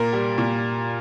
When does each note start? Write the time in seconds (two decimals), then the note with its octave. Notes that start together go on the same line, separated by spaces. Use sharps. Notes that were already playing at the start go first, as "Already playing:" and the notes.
Already playing: A#2 A#4
0.13 G3
0.38 A#2